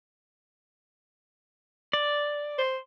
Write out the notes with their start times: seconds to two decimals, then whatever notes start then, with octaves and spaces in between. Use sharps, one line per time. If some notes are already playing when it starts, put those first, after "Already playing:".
1.93 D5
2.59 C5